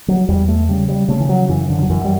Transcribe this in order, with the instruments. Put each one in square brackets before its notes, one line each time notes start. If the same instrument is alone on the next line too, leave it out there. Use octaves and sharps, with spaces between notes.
[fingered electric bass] F#3
E2 G3
A3
C#3 G3
G3
C#3 A3
E3
F#3
F#2 E3
D3
F#3
F#2 E3
G3